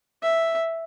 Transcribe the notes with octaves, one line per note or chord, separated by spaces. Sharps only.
E5